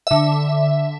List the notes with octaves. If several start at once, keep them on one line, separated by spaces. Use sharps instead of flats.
D3 E5